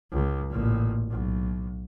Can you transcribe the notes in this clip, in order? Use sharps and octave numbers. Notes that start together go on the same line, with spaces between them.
C#2
A1 A#2
B1